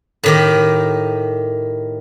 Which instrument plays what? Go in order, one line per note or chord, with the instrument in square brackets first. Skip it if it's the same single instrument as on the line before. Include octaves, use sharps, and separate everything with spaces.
[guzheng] A2 D#3 G4